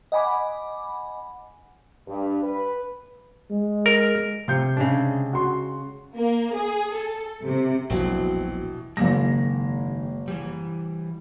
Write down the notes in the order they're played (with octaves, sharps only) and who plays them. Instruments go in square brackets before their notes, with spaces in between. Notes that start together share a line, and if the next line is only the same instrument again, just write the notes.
[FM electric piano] D#5 F#5 G#5 B5 D6
[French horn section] G2
B4
[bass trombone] G#3
[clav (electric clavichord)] A#4
[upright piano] C3 G6 C#7 [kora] F4
[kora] C#3 G#3 D4
[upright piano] F#4 C6
[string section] A#3
G#4
A4
C3
[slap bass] E1 A#1 E2 [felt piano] B2 E3 [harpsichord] F#3 C4
[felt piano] F#1 A#3 A#6 [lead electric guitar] D#3 G#3
[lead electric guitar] E3 G3